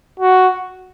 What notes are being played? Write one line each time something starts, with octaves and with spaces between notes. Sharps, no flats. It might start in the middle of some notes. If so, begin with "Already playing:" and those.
F#4